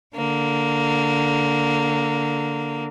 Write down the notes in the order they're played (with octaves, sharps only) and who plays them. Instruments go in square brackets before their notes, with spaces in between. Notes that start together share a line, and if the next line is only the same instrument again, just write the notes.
[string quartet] D3 A#3